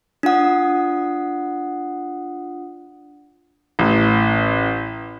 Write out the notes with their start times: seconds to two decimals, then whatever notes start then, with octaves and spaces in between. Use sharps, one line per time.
0.23 D4 F4 F#5 D#6
3.79 A1